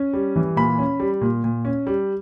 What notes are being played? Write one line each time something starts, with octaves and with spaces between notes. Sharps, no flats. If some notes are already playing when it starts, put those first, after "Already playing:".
Already playing: C#4
G3
E3
A#2 B5
C#4
G3
A#2
A#2
C#4
G3